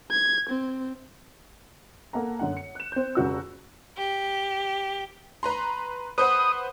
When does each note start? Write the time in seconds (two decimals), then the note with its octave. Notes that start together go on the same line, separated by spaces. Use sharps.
0.11 G#6
0.49 C4
2.13 A#3 A4 F#5 A#5
2.39 F#2 D3 F#5
2.57 C#7
2.75 F#6 E7
2.92 C4 G6
3.15 F1 C#3 F#4 E6
3.97 G4
5.43 B4 A#5 C6
6.18 B4 C5 F#5 D#6